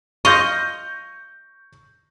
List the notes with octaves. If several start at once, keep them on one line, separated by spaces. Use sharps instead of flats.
F4 D#5 C#6 G6 A#6